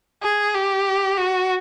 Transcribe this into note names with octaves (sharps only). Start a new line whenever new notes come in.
G#4
G4
F#4